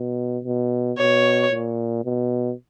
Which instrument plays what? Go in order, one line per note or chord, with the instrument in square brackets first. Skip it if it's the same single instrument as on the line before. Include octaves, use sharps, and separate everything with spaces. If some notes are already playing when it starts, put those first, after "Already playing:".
Already playing: [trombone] B2
B2
[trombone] B2 [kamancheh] C#5
[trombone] A#2
B2